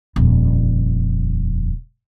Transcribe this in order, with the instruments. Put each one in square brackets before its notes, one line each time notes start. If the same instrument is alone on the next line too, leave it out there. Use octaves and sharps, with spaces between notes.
[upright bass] D#1 F2